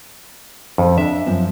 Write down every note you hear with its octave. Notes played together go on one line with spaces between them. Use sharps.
F2
D4 E5
F#2 F3 C4